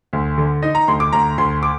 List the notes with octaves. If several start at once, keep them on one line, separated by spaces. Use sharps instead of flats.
D2
D3
D#4 D#5
A#5
D2 C6
D6
D2 A#5
D2 C6
D6